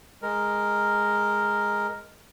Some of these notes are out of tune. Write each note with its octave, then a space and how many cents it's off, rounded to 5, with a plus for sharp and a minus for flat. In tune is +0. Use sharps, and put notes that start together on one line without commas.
G#3 +0 A#4 +0